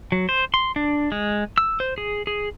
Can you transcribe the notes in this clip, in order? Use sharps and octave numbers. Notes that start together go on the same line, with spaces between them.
F#3
C5
C6
D4
G#3
E6
C5
G#4
G#4